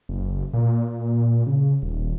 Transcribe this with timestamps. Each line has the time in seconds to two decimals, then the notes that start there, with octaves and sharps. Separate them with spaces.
0.09 F#1
0.54 A#2
1.47 C#3
1.82 D#1